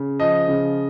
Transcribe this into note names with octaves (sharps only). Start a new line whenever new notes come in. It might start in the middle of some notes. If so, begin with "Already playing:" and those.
Already playing: C#3
F3 D#5
C#3